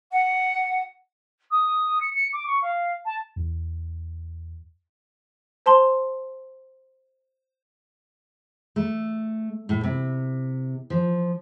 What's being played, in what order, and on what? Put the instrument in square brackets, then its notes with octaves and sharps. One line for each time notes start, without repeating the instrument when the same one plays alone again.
[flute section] F#5
[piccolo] D#6
C#7
C#7
D6
C#6
F5
A5
[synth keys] E2
[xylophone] C5 A5 C6 G7
[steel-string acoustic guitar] A3
A2
C3
F3